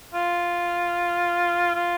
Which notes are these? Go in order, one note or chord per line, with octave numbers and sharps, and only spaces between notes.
F4
F4